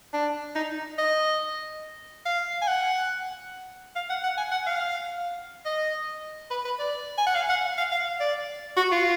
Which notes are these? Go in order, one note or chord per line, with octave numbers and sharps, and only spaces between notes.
D4
D#4
D#5
F5
G#5
F#5
F5
F#5
F#5
G#5
F#5
F5
D#5
B4
B4
D5
G#5
F#5
F5
F#5
F5
F5
D5
F#4
F4